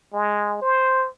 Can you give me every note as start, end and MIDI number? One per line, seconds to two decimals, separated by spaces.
0.13 0.60 56
0.62 1.08 72